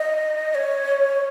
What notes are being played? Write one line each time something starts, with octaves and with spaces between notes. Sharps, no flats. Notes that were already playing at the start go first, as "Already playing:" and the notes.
Already playing: D#5
D#5
C#5